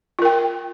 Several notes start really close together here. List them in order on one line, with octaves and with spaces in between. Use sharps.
F4 A#4 G5